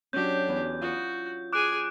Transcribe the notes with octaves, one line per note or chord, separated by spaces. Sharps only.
F#3 C#4 D4 G4 G6
E2
F4 F#4 D#6
G#4 G#5 D6 F#6 D7